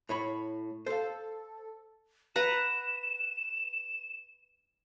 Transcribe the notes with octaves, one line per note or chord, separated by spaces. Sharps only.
A2 C#5 B5
A4 C5 F5
B4 F#5 A#5 E7